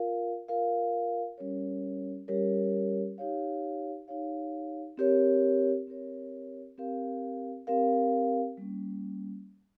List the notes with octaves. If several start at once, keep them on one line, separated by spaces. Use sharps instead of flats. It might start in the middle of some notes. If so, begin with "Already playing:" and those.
Already playing: F4 A#4 F5
F4 A#4 F5
G3 C#4 G4 A#4 C#5
G3 C#4 G4 A#4 C#5
D#4 G4 C#5 F5
D#4 G4 C#5 F5
C4 G4 A#4 C#5
C4 G4 A#4 C#5
C4 G4 A#4 F5
C4 G4 A#4 F5
G3 A#3 C#4